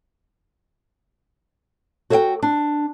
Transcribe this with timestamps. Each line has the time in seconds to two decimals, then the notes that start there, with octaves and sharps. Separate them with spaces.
2.10 F#4 A4 C#5 E5 F#5 G5
2.42 D4